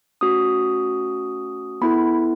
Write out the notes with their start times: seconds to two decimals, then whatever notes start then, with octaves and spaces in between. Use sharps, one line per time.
0.21 A3 C#4 F#4 D#6
1.81 B3 E4 A4 B5